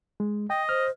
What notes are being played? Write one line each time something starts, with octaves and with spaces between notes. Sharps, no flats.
G#3
D#5 G5
C5 F6